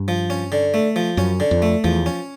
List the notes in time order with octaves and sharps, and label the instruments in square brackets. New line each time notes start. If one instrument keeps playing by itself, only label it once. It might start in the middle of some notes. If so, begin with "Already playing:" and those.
Already playing: [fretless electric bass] G2
[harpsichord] F3
C#4
D3
A3
F3
[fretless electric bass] F#2 [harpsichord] C#4
[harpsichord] D3
[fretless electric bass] F2
[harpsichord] A3
[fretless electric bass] E2 [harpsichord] F3
[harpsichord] C#4